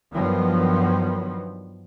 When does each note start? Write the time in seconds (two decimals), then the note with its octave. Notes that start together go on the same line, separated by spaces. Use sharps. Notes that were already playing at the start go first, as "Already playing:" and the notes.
0.13 G2 D#3 F3 F#3 B3